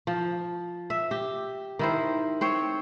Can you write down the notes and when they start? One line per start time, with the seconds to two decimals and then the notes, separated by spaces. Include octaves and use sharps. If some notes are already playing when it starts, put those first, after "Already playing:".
0.07 F3
0.90 E5
1.11 G4
1.79 D#3 E4 C5
2.41 C4 C5 C#5